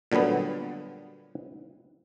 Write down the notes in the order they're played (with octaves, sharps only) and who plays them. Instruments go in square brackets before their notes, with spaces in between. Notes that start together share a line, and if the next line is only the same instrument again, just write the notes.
[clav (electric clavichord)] A#2 D3 F#3 G3 B3